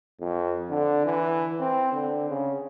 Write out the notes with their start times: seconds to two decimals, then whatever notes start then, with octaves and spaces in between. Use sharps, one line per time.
0.20 F2
0.70 D3
1.06 E3
1.60 C4
1.93 D3
2.29 C#3